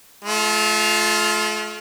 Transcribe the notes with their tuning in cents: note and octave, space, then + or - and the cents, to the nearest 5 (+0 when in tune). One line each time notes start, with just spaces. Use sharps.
A3 -40 F4 +0